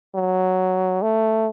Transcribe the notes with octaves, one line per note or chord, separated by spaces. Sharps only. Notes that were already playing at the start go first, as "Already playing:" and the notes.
F#3
A3